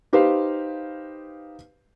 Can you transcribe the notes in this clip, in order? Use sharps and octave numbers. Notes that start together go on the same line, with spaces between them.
D#4 G4 B4 C5 F5